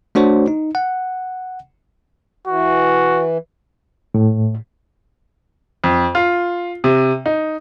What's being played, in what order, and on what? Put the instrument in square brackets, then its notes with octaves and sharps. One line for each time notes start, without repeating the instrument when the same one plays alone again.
[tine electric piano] A3 D4 F#4 C5 C#5
D#4
F#5
[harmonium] E3 [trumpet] F#4
[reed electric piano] A2
[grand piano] F2
F4
C3
D#4